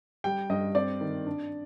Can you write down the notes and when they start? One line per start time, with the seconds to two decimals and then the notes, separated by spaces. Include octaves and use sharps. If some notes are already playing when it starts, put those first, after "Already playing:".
0.24 G3 G5
0.50 G2 D#5
0.75 C4 D5
1.01 D#3
1.27 D4